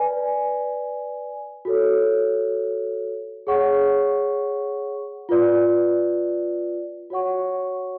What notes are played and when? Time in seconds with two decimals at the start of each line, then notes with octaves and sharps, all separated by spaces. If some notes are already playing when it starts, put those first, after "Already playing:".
Already playing: B4 D5 G#5
1.65 F#4 A4 C#5
3.47 G#4 C#5 F#5 C#6
5.29 F4 B4 D5
7.10 F#4 C#5 F#5 C#6